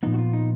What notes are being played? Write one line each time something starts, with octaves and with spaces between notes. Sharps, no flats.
A#2 F3 B3 D#4
F#4
F4
D#4